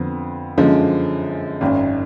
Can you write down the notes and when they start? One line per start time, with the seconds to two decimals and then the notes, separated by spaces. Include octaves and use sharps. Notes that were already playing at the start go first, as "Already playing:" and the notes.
Already playing: F2 D3 F3 B3
0.58 F#2 D3 F3 G#3
1.61 G#1 F#2 D#3